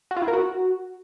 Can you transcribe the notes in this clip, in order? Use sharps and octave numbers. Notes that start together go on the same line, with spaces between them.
F#4
F4
E4
A#4
F#4